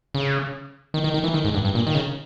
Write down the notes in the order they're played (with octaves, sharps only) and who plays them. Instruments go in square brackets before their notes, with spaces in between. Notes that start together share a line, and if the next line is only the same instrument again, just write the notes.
[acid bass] C#3
D#3
D#3
D#3
E3
D#3
G#2
G2
G2
A#2
D#3
C#3